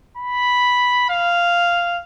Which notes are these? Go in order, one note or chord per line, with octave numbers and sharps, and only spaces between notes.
B5
F5